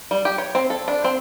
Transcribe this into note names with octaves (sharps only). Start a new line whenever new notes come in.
G3
G4
C#5
C4
A4
D4
C4